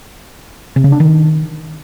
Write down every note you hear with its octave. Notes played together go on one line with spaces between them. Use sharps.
C3
C#3
D4
D#3